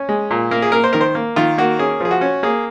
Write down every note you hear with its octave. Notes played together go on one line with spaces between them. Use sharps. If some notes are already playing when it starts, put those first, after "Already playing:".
Already playing: C#4
G#3
A#2
A#3 A#4
G#4
A#3 A#4
C5
D#3 A#4
C5
A#3
D#3 F4
A#3 F#4
C#4 G#4
F3 G#4
F#4
C#4
A#3 G#4